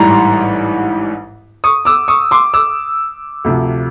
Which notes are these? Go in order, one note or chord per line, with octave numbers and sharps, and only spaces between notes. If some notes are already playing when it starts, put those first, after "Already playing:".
Already playing: A1 G#2 E3 G3 A#5 C6
C#6 D#6
D6 E6
C#6 D#6
C6 D6
D6 E6
D2 C3 F3